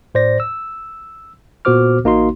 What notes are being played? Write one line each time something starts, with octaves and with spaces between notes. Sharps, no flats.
A2 C5 D5 A#6
E6
A#2 B3 F#4 C5 D6 F6
A1 A#3 D#4 F#4 C6